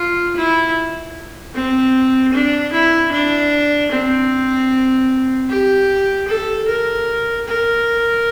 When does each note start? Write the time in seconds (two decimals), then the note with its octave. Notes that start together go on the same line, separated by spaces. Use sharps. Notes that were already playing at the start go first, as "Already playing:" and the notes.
Already playing: F4
0.36 E4
1.55 C4
2.33 D4
2.72 E4
3.12 D4
3.92 C4
5.49 G4
6.28 A4
6.68 A#4
7.48 A#4